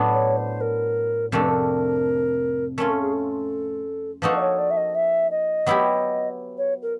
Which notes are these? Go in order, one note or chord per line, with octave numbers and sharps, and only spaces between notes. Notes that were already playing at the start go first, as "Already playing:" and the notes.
Already playing: A2 F#3 B3 D4
C#5
C5
A#4
F2 C3 F3 A3 D4 A#4
B4
A#4
A3 C#4 F4 A#4
A4
G#4
A4
F3 A#3 D#4 F#4 A4 B4
D5
C#5
D5
E5
D#5
E5
D#5
F#3 B3 E4 G4
C#5
A#4